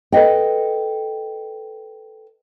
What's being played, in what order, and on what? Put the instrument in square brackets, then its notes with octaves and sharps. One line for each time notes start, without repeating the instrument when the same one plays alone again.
[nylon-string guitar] A4 B4 D#5 G5